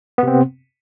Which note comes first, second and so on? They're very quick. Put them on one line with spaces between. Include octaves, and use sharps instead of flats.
B3 C3 C4